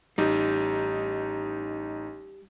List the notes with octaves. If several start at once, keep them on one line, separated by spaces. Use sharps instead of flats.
A1 G3 D#4